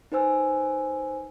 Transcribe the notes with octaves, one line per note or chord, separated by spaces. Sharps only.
D#4 B4 C5 G#5 E6